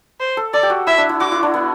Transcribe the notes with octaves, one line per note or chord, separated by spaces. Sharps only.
C5
A4
A4 D5
G4
F#4
E4 E5
D4
E4
F#4 D6
E4
D4
B3